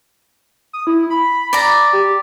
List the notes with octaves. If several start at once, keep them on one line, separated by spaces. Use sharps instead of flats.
D#6
E4
B5
D5 A#5
G4